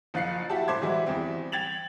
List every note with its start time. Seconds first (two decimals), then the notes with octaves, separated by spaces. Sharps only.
0.14 F#1 F3 F5 F#6 C7 C#7
0.49 E4 F#4 G4 A5
0.68 A2 C5 C6 D6 G#6
0.82 E3 G3 G#3 E4 F#4
1.06 E2 G3 C4
1.52 G5 G#6 A6 F7 F#7